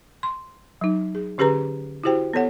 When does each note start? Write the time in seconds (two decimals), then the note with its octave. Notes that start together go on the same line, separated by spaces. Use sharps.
0.23 C6
0.81 F#3 D#4
1.15 G#4
1.38 D3 C#4 G4 G#4 B4 A#5
2.04 E4 F#4 G4 C5 G5
2.33 B3 A4 C#5 F#5